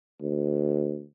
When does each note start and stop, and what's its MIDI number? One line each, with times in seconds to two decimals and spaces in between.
0.21 1.03 38